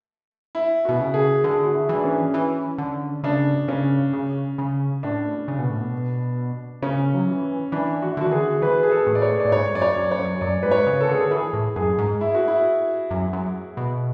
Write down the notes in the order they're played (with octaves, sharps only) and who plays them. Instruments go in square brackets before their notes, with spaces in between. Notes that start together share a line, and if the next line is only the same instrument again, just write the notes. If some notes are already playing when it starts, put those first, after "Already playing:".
[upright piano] E4
[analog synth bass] B2 [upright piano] F#4
[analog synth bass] C#3
[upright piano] G#4
[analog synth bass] D3 [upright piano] G#4
[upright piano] F#4
E4
[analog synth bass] E3 [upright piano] D4
[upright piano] C#4
[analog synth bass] E3
D3
[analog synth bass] C#3 [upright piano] D4
[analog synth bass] C#3 [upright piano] C#4
[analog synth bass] C#3
C#3
[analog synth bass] A2 [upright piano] D4
[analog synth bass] C#3
B2
A2
B2
[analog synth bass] C#3 [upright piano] C#4
[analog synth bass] F#3
E3
[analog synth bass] E3 [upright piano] D4
[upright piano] F#4
E4
[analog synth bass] D3
[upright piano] F#4
[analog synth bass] E3
[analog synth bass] D3 [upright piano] G#4
[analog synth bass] E3 [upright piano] B4
[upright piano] G#4
A4
[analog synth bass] A2
[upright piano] D5
C#5
[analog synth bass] A2 [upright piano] D5
[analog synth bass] G#2 [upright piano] C#5
[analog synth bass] F#2 [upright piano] D5
[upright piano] C#5
[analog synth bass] F#2
[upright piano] C#5
[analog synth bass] F#2
[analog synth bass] F#2 [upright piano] D5
[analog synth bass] G#2 [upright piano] B4
[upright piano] C#5
[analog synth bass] C#3
[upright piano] A4
[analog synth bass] D3 [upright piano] G#4
[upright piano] A4
[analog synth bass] E3 [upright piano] G#4
[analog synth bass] A2
[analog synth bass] F#2 [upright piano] G#4
[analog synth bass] G#2
[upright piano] E4
F#4
E4
[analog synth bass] F#2
F#2
B2